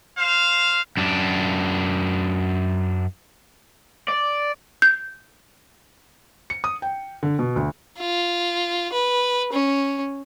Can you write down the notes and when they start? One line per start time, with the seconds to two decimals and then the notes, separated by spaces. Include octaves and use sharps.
0.18 C5 F5
0.97 F#2 D4
4.09 D5
4.82 G6
6.50 C#7
6.64 D#6
6.82 G5
7.23 D3
7.39 B2
7.56 D2
7.99 F4
8.93 B4
9.52 C#4